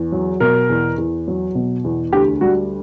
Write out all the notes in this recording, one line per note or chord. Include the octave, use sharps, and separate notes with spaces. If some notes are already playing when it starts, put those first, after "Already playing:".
Already playing: E2
F#3
B2 A#4
E2
E2
F#3
B2
E2
D2 G4
G3 F#4